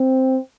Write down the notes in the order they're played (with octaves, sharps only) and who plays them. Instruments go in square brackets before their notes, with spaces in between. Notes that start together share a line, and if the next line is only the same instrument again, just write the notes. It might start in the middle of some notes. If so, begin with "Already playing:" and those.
Already playing: [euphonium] C4